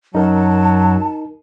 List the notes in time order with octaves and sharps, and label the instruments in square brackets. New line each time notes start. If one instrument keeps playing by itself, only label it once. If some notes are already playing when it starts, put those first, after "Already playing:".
[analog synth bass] F#2 [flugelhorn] F#3 [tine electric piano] D#4 A#4 [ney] A5